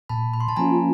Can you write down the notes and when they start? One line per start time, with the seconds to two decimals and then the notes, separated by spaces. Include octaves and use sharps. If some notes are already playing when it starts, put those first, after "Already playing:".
0.09 A#2 A5 B5
0.34 B5
0.40 C6
0.48 A5 B5
0.56 F3 A#3 C#4 F4 G#5 A#5